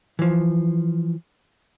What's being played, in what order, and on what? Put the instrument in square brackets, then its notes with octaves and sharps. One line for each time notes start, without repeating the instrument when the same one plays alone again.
[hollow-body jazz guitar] E3 F3